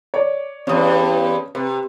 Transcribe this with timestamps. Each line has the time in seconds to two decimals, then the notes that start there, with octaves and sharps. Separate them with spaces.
0.14 C#5 D5
0.67 E2 G2 C#4 D#6
1.55 C3 B4